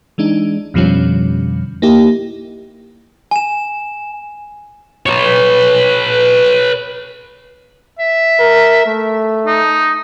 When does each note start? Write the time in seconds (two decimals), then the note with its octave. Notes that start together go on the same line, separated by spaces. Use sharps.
0.18 E3 G#3 D4 D#4
0.74 F2 B2 D3 F3 G3 C#4
1.82 A#3 D#4 E4 G4
3.31 G#5 E7
5.06 B4 C#5
7.99 E5
8.40 A#4
8.86 A3
9.47 D#4